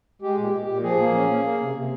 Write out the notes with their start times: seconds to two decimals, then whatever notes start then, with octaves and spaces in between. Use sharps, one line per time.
0.22 G#3 G4
0.38 A#2
0.43 G4
0.53 A#2
0.64 A#2 G4
0.83 F3 G#4
0.99 A#3
1.14 C#4
1.30 A#3
1.44 A#3
1.60 C3
1.75 C3